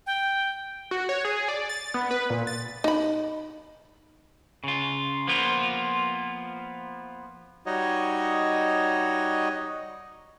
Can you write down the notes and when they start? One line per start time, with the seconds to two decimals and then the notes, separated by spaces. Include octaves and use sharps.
0.06 G5
0.91 F#4
1.09 C#5
1.25 G#4
1.48 D5
1.69 A6
1.94 B3
2.11 B4
2.30 A#2
2.47 A6
2.84 D#4 B5
4.64 C#3 F4
5.27 F3 A#3 B3 F4
7.66 G3 D#4 F#4 C#5 D#5